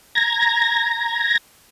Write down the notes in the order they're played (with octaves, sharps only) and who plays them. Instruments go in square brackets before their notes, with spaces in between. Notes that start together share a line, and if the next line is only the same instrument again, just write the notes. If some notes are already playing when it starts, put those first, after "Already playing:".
[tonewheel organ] A#5 G#6 A#6